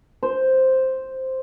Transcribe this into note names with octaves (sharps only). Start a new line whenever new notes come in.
C5